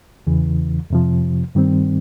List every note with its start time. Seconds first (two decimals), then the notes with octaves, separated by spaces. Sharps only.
0.27 E2 C#3 E3
0.90 F2 C3 F3
1.55 G2 D#3 G3 C4